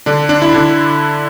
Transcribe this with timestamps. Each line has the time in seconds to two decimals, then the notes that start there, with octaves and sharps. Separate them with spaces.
0.06 D3 D4
0.29 D4
0.42 E4
0.54 D3 D4